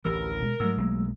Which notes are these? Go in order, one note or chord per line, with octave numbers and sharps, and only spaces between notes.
A1 D2 E3 G4 A#4 E6
B2 G#3
G#2 F#3 A3 E6
B1 G#3 A#3